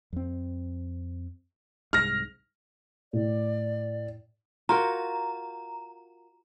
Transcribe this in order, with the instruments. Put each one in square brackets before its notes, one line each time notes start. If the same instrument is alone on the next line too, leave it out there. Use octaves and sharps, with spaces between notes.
[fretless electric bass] F2 C4
[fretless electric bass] C2 G#2 [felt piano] F6 A#6
[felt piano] A2 [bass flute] D5
[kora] F4 F#4 A#4 [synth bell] A#5